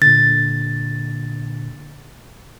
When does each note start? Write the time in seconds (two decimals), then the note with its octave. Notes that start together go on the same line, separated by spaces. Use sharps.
0.02 A#2 D3 A6